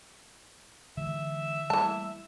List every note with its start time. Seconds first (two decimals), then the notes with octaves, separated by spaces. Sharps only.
0.97 D3 E3 G#3 E5
1.70 E3 G3 A3 A#3 A5